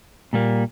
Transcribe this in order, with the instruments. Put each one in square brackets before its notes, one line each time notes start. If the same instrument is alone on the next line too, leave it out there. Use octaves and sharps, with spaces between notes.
[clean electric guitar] A#2 G3 A#3